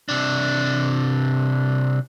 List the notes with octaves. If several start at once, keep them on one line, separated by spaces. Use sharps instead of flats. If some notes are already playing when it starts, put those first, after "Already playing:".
C3 D4